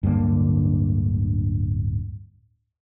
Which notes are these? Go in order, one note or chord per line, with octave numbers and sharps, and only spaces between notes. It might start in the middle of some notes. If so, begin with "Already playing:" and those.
D1 G2 D3 A#3